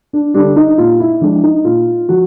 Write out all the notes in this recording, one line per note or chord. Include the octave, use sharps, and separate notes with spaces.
D4
D3 G3 D4
D#4
A#2 F4
E4
F3 G#3 D4
D#4
A#2 F4
F3 F#4